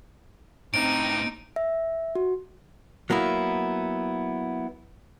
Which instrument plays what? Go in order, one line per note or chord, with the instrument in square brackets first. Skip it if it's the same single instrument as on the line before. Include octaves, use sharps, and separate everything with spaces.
[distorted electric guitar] A2 G4 [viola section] C4 A#5 [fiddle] D#4 [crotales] D7
[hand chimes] E5
F#4
[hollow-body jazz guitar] F#3 A#3 B3 E4